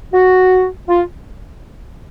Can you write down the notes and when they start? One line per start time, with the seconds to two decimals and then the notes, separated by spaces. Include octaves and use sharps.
0.14 F#4
0.88 F4